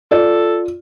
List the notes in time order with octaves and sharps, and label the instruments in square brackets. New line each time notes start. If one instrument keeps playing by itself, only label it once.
[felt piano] F4 D5 [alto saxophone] A4